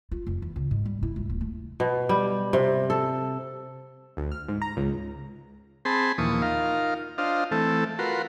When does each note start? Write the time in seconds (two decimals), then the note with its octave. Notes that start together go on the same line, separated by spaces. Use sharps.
0.11 F4
0.27 F1
0.42 E2
0.56 C#2
0.71 G#2
0.86 G3
1.03 E4
1.16 C#2
1.29 D#1
1.41 A3
1.80 B2
2.09 G3
2.53 C3
2.90 A4
4.17 D2
4.32 F6
4.48 G#2
4.62 A#5
4.77 C#2
5.85 C4 G#4 A5 B5 C6
6.18 D#2 A#2 E3 F3 C#6 D#6
6.42 D#4 F4 A#4 F5
7.18 D4 F4 C5 D#5 F5
7.51 E3 A3 C4 A4
7.99 F4 F#4 A#4 B4 C6